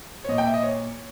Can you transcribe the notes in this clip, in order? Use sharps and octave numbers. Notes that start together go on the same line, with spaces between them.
C#5
A#2 D#5
G5
E5
D#5
C#5